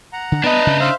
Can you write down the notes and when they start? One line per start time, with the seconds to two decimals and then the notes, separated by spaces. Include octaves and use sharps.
0.13 F#5 A#5
0.32 D3
0.44 B3 D4 B4 D#5 A5 A#5
0.67 C#3
0.80 C5 E5 F5